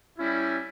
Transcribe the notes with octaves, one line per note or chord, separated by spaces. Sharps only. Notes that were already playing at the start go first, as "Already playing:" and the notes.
G3 C#4 E4